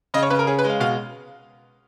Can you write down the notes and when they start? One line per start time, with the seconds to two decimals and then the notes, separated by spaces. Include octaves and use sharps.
0.14 C#3 D#5
0.23 C#5
0.30 C#3 B4
0.39 A#4
0.47 C#4 G#4
0.59 B4
0.64 G#3
0.70 F5
0.80 B2 F5